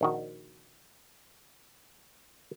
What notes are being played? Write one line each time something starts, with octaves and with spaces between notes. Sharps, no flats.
A#1 D#3 F#4